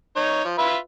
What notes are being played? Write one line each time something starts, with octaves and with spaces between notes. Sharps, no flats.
D#4 C#5
F3
F4 B4 E5